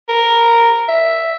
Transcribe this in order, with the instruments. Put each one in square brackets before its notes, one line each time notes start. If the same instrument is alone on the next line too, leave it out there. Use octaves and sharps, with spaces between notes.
[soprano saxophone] A#4
E5